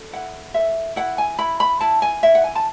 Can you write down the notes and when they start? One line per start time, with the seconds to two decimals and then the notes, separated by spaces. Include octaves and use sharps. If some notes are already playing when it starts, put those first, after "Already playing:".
Already playing: A4
0.13 E4 F#5
0.54 A4 E5
0.96 E4 F#5
1.18 G#5
1.38 E4 B5
1.60 B5
1.80 E4 A5
2.02 G#5
2.23 E4 E5
2.35 F#5
2.44 G#5
2.55 A5